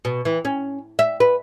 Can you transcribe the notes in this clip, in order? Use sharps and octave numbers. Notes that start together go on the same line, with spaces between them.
B2
E3
C#4
E5
B4